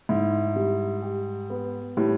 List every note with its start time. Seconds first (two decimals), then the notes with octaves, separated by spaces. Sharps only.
0.09 G#2 E4
0.56 G3
1.02 G4
1.50 B3
1.97 A2 G3